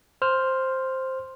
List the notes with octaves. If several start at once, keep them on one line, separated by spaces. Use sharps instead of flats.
C5 F6